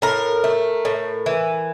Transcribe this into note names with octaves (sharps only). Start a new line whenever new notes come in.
A2 A#4
A3
A2
E3